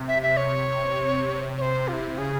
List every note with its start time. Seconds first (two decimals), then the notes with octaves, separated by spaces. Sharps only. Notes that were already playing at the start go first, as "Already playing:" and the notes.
Already playing: C3
0.08 E5
0.22 E5
0.37 C#5
1.57 C#5
1.62 C5
1.88 F4
1.93 E4
2.18 C#3 G#4